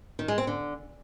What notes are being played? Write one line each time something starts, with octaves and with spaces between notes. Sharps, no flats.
D#3
G#3
C4
D3